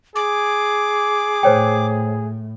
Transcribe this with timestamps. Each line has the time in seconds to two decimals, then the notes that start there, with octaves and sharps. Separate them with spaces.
0.16 G#4 D6
1.43 A2 C5 C#5 G5